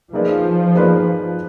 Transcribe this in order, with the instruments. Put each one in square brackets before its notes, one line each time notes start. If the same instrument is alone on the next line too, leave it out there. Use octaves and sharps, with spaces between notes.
[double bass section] F3 [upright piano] A#3 D#4 G#4 B4 D5
[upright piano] A#3 D#4 G#4 B4 D5